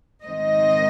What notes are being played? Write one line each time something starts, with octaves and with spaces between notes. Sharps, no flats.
G#2 D#3 C4 D#4 D#5